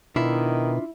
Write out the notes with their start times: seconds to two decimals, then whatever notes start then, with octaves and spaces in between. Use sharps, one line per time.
0.16 B2 D#3 D4 E4 F4 E5